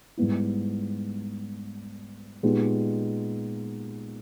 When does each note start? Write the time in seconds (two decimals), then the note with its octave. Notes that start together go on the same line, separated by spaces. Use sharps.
0.17 G#2 G3 B3 E4
2.43 A#2 G#3 B3 D#4 G4